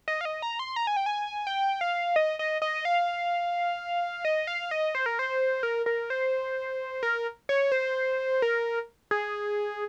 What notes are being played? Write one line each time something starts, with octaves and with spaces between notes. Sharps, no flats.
D#5
F5
D#5
A#5
C6
A#5
G#5
G5
G#5
G5
F5
D#5
D#5
D#5
F5
D#5
F5
D#5
C5
A#4
C5
A#4
A#4
C5
A#4
C#5
C5
A#4
G#4